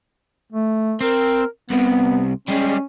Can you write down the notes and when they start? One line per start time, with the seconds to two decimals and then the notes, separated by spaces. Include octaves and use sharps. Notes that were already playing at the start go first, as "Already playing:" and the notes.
0.52 A3
1.01 C4 A#4
1.71 C2 C3 B3
2.48 G3 G#3 C#4